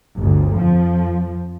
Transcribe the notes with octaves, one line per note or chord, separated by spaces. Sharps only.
G1 D2
F2 F3